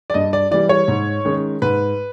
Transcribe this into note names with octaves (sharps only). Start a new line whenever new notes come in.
D5
G2 D#5
D5
E3 G3 D5
C#5
G#2
D#3 G#3 C#4
G#2 B4